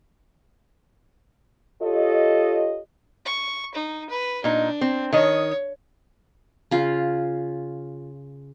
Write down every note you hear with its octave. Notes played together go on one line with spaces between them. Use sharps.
F4 G4 A4 C#5 D#5
C#6
D#4
B4
A#2 D4 D#4
C4
D#3 C#5 D#5
C#3 F4